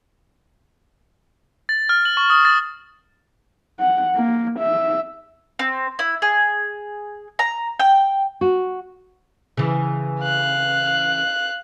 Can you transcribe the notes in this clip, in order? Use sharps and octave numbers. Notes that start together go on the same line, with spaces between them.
A6
F6
F#7
C#6
D#6
A6
F#5
A#3
E5
C4
E4
G#4
A#5
G5
F#4
C#3 E3
F5 F#6